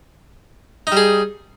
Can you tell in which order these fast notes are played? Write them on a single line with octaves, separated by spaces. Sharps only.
D#4 G3 G#4